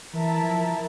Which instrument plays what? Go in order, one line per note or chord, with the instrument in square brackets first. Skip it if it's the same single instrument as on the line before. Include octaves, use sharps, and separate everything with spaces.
[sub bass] E3 [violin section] E4 A#4 E5 A5
[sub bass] F3